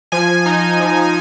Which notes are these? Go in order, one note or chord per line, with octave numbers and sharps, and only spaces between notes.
F3 G#5
D#4
F3